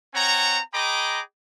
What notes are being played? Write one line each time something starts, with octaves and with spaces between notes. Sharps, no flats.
C4 C#5 F#5 G#5 A#5
G#4 D#5 G5 A#5 B5 D6